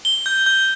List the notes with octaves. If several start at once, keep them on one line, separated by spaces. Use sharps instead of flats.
G7
G6
G6